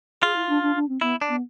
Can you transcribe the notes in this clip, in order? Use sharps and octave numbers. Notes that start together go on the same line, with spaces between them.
F4 G#4
E4
D4
D4
D4
C4
B3 E4
D4
B3